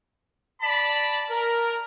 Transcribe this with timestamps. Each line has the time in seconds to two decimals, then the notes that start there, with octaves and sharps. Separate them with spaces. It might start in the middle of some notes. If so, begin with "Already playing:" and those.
0.60 D5 A5 B5
1.29 A#4